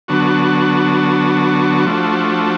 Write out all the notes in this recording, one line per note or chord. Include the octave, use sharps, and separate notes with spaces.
D3 F#3 B3 D4 F#4
F3 A3 D4 F#4